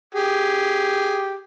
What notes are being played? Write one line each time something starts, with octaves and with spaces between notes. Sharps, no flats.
G4 G#4